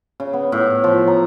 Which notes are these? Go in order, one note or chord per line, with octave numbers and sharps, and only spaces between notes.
C#3
B3
A2
F3
A#5